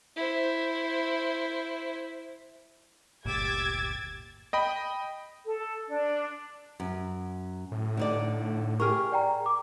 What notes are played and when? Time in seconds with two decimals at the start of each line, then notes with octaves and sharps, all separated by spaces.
0.17 E4 C5
3.25 G1 D2 A#2 G4 D6 E6 G#6 A6
4.53 D#5 G5 B5
5.46 A4
5.88 D4
6.80 F#2
7.72 A2
7.97 D3 D#4 D5
8.80 G4 G#4 A#4 C#6 F6
9.12 D5 G5 A#5
9.46 D6